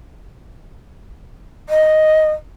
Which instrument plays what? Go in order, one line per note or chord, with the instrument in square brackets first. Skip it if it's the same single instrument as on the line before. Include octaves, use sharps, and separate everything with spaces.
[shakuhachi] D#5